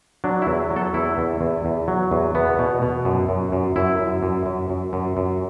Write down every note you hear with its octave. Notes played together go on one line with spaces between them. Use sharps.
F#3 D4
E4
E2
F#3
A4
E2 E4
E2
E2
E2
F#3
E2
E2 B3
B2
B2
F#2
F#2
F#2
F#2 E4
F#2
F#2
F#2
F#2
F#2
F#2